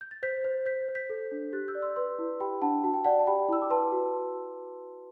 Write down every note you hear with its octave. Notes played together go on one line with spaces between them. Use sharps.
G6
A6
C5 G6 B6
C5
C5 G6 B6
C5
G6 B6
A4
D4
G4 F#6 A6
E6 G6
D5
C6 E6
B4 C6 E6
E4
G4 G5 B5
D4 F#5 A5
F#4 A5
G5
D5 F#5 A5
A5
G4 G5 B5
E4 E6
D6
B4 A5 C6
F#4